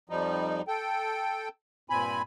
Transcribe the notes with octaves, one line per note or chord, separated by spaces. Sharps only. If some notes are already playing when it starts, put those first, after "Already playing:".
F2 F3 G3 D#4
A4 G5
G2 A#2 C4 G#5 B5